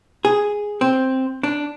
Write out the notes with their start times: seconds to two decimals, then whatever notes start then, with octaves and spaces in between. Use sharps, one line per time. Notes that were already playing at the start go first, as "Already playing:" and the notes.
0.25 G#4
0.81 C4
1.43 D4